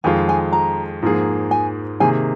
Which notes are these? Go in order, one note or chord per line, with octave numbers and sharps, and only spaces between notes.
F2 D#3 G#3 F4 G#5
G#5
A#5
G#2 F3 A#3 G#4
G#5
C3 D#3 A#3 G#4 G#5